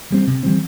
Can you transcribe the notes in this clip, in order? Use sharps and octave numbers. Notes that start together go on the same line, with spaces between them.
E3 G3 C4
C3
E3 G3 C4